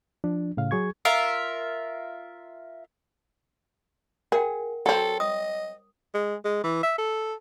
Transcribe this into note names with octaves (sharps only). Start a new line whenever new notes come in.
F3 D4
A2 C#3 F5
F#3 G#4 C#6 G#6
F4 A#4 E5
G#4 A#4 F#5 G5
F#3 C4 A4
D#5 D#6
G#3
G#3
E3
E5
A4